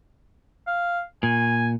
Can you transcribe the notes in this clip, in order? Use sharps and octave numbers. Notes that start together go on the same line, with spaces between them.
F5
A#2 G#5